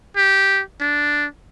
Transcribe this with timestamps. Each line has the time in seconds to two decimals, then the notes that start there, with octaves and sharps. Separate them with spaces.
0.17 G4
0.81 D4